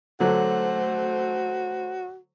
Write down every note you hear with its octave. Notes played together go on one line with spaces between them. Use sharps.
D3 F#3 A3 F#4 C5